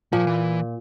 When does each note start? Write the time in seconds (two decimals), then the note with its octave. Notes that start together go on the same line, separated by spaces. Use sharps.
0.12 A#2 F3
0.27 E3